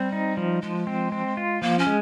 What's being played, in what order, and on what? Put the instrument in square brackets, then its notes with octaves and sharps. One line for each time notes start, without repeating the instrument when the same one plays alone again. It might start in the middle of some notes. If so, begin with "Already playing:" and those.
Already playing: [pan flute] G3 [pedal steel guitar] C4
[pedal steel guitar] D#4
F3
[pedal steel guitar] F3 [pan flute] G#3
[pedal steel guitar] C4
C4
F4
[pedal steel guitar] F3 [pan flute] A#3
[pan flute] C#4
[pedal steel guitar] G#3